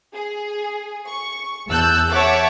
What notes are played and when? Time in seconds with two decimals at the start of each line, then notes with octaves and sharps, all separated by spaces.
0.14 G#4
1.06 C#6
1.68 E2 A5 E6 F#6 G6
2.10 C#5 E5 F#5 A5 C#6 D6